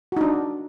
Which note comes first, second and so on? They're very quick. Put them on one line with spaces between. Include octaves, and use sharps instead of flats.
F#4 D#4 D4